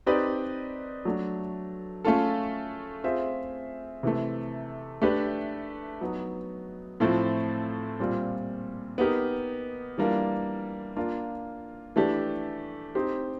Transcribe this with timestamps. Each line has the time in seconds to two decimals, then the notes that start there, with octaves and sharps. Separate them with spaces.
0.06 C4 D#4 G4 B4 D5
1.05 F#3 A3 D4
2.04 A3 C#4 F4 A4
3.04 C4 F4 G#4 C5 E5
4.03 C3 E3 A3
5.02 A3 D4 G4 B4
6.01 F#3 B3 D#4
7.00 A2 F3 A3 C4
7.99 A#2 G3 C4 F4
8.98 B3 D#4 G4 A#4
9.98 E3 G3 A#3 D4 F4
10.96 A#3 D4 F4
11.96 E3 A3 D4 G4
12.95 C4 D#4 G4 C5